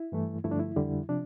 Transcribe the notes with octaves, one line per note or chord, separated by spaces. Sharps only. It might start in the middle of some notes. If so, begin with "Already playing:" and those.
Already playing: E4
G2 E3 A3
G2 D3 F3 A3 E4
D4
E4
F2 D3 G3
C3 F3 D4